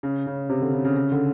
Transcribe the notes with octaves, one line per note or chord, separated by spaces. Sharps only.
C#3
C#3
C3
D3
C#3
C#3
C#3
D3